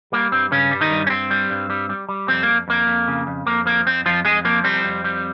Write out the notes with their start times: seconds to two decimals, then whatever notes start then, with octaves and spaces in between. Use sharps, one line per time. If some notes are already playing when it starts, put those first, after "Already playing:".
0.12 G3 A#3
0.32 G2 C4
0.51 G2 C#3 C#4
0.71 G3
0.81 D#3 D#4
0.91 G2
1.07 C#4
1.10 G2 C4
1.31 G3
1.50 G2
1.70 G3
1.89 G3
2.09 G3
2.28 F2 C4
2.43 F2 A#3
2.68 F2 A#3
2.87 F2
3.08 C#3
3.27 F2
3.46 F2 A#3
3.66 F3 A#3
3.86 F2 C4
4.06 F2 F3 F4
4.25 F2 G#3 G#4
4.45 F3 A#3
4.64 G3 C4
4.84 F2
5.04 G3